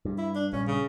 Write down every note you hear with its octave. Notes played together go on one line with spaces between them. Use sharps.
G2
E4
D4
A#1 G2 C#4
C#3